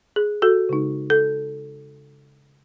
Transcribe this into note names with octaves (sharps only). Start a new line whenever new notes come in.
G#4
F#4 A4
C#3 G#3 D#4
A4